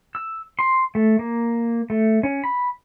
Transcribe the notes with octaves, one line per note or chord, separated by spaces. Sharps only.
E6
C6
A3
A#3
A3
C#4
B5